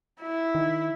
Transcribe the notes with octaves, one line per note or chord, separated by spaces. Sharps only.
E4
D#3